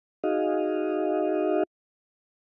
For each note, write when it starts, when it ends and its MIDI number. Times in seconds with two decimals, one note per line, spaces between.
0.24 1.63 63
0.24 1.63 66
0.24 1.63 68
0.24 1.63 75
0.24 1.63 77